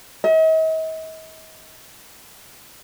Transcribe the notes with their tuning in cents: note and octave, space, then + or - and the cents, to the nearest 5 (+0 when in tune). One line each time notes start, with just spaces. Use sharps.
D#5 +45